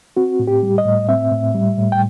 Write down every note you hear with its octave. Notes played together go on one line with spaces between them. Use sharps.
C4 F#4
A2
G4
G3
D#5
A2
C4 E5
A2
G3
A2
G5